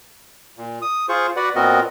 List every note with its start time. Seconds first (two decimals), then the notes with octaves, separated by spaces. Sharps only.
0.57 A#2
0.82 D#6
1.09 F4 G#4 C5 C#6
1.36 F#4 B4 D5 F#5
1.56 A#2 B3 C4 F#4 A#4 D#5